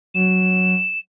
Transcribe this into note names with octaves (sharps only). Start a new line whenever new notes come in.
F#3 E7